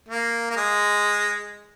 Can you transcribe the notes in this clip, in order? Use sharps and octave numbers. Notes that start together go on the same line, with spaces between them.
A#3
A#3
G#3